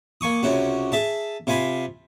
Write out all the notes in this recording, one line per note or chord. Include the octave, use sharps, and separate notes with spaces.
A#3 G#5 C#6 D#6
C#2 C3 C#4 F#4
G#4 E5 A5
C3 F4 G#5 B5 C6